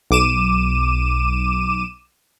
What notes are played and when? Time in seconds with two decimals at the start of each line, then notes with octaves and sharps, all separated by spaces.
0.11 B1 D6 D#7 E7